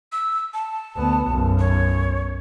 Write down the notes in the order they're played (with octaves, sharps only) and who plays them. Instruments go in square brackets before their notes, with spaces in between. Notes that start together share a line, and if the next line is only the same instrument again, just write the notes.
[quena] E6
A5
[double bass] D2 B3
B1 F#2
[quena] C#5